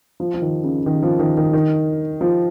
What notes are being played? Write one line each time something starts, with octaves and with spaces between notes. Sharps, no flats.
F3
F3
D#3
C#3
D#3
F3
D#3
D#3
D#3
F3